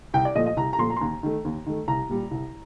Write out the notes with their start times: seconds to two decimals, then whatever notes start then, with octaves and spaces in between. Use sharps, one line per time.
0.14 C2 G5
0.25 D5
0.35 A#2 F3 A3 D#5
0.46 D#5
0.57 C2 A#5
0.73 A#5
0.79 A#2 F3 A3 C6
0.90 A#5
0.96 C6
1.01 D#2 A#5
1.23 D#3 A3
1.45 D#2
1.66 D#3 A3
1.88 C2 A#5
2.09 A#2 G3
2.31 C2